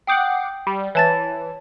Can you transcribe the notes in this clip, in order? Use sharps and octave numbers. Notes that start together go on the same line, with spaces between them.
F#5 G5 D6 D#6 G6 C7
G3
E3 C#5 A5 A6